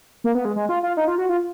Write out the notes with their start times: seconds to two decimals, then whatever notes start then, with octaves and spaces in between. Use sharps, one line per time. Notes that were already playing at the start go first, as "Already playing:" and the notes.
0.24 A#3
0.35 B3
0.45 G#3
0.56 G#3
0.69 F4
0.83 F4
0.97 D#4
1.08 F4
1.18 F#4
1.29 F4